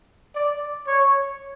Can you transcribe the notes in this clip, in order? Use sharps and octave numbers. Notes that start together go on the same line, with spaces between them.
D5
C#5